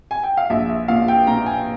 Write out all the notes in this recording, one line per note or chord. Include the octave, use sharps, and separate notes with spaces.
G#5
G5
F5
A#1 E5
E5
A#2 F5
G5
A#2 A#5
G#5